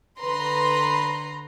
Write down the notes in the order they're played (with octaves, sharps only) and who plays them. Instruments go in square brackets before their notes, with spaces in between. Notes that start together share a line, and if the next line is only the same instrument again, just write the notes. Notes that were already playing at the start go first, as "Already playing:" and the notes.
[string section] D3 B4 A#5 C6